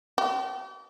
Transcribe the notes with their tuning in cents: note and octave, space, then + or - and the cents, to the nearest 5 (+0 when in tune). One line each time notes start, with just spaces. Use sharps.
G4 -40